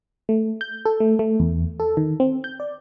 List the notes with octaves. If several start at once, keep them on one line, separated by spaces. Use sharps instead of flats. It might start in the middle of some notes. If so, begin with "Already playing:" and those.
A3
G6
A4
A3
A3
E2
A4
D#3
C4
G6
D5